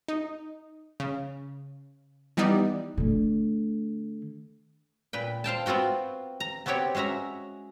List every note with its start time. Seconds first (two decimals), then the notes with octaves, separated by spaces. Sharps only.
0.08 D#4
1.00 C#3
2.37 E3 G3 B3 D#4 D5
2.97 D3 A3
5.13 A#2 B4 G5
5.44 C5 F5 G5 A5
5.66 B3 C4 F4 F#4 G5
6.40 A#5
6.66 B3 C4 F#4 G4 C#5 G5
6.95 G#3 C#4 F#4 E5 A#5